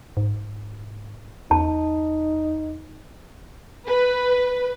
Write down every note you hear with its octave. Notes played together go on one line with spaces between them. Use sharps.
G#2
E2 D#4 A5
B4